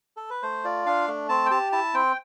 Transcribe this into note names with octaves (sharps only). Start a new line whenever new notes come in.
A4
B4
A3 C5
F4 D5
D4 F5
A3
C4 A5
G5
G4 A5
E4 A5
C4 G5